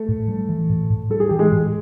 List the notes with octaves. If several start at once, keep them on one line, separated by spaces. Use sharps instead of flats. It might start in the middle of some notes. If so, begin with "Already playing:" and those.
Already playing: A3 A4
A2
G3
E3
A2
A2
G3 A4
G#4
E3 G4
G#3 G#4
A2